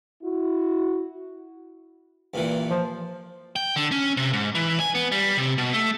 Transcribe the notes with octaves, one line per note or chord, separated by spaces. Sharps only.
E4 F#4
G2 A#2 E3
F3
G5
D3
C#4
C3
G#2
E3
G#5
B3
G3
C3
B2
A3